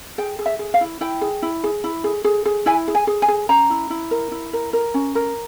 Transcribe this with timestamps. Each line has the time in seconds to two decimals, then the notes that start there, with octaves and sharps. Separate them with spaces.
0.18 G#4 G5
0.39 G#4
0.46 E5
0.59 G#4
0.74 F5
0.81 E4
1.01 E4 G5
1.21 G#4
1.42 E4
1.64 G#4
1.84 E4
2.04 G#4
2.24 G#4
2.45 G#4
2.66 E4 G#5
2.88 G#4
2.95 G#5
3.07 G#4
3.22 G#5
3.28 G#4
3.49 C#4 A#5
3.70 E4
3.90 E4
4.11 A#4
4.31 E4
4.53 A#4
4.73 A#4
4.94 C#4
5.15 A#4